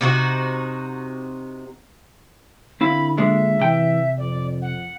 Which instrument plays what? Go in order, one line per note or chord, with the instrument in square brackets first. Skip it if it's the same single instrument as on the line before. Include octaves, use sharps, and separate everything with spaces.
[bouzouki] C3 D#4 F#4
[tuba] D3 [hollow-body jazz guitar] C4 E4 F5 [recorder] B5
[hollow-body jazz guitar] A#2 G#3 D4 [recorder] E5
[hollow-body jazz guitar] C3 G5 [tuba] E3
[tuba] F2 [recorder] D5
[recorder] F#5